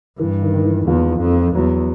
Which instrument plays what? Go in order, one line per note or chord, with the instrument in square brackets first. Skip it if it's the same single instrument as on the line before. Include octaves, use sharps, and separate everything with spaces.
[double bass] G2 [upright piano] E3
[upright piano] D#3
D#3
E3
[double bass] E2 [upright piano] F3
[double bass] F2
[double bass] E2 [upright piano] F#3